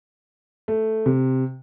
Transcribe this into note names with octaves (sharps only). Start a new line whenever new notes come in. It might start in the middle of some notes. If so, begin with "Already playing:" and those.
A3
C3